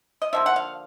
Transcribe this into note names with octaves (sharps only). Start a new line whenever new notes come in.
D#5
D3 F3 A#3 E5
F#5
F5